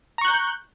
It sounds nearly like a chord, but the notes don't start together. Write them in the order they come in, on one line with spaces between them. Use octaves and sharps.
A#5 C#6 F#6 G6